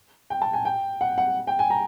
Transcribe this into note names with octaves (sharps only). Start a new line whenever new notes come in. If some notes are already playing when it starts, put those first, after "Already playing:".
G5
A5
G#5
G5
F#5
F#5
G5
G#5
A#5